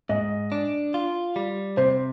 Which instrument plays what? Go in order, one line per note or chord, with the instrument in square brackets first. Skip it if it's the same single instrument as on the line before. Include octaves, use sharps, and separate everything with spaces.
[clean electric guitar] G#2 [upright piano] D#5
[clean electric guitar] D4
F4
G3
[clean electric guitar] C3 [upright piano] C5